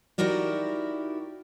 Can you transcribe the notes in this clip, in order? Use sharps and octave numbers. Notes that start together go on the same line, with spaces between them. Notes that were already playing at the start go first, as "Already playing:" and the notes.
D#4 E4 F#4 G4 A#4 D5